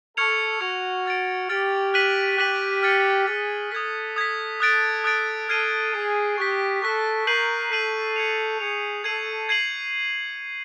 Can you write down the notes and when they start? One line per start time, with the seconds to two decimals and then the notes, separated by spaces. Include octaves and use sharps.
0.17 A4 C#6 F6 G#6 C#7 F7
0.61 F#4 C#6 F6 G#6 C#7 F7
1.06 F6 A6 D7
1.49 G4 F6 A6 D7
1.94 F#6 B6 D#7 F#7
2.38 G4 F#6 B6 D#7 F#7
2.83 F6 A6 C#7
3.27 G#4 F6 A6 C#7
3.71 A4 D#6 G#6 B6
4.16 D#6 G#6 B6
4.60 A4 D#6 F#6 A6 D7
5.04 D#6 F#6 A6 D7
5.49 A4 F6 G#6 C7 D#7 G7
5.93 G#4 F6 G#6 C7 D#7 G7
6.38 G4 C#6 F#6 B6
6.82 A4 C#6 F#6 B6
7.27 A#4 G6 C7 D#7 F#7
7.71 A4 G6 C7 D#7 F#7
8.16 G#6 C#7 F7
8.60 G#4 G#6 C#7 F7
9.04 A4 G#6 C7 D#7 F#7
9.49 G#6 C7 D#7 F#7